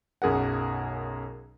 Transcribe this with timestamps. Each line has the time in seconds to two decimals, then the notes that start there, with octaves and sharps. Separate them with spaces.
0.22 B1 F#2 G#4 A#4 F#5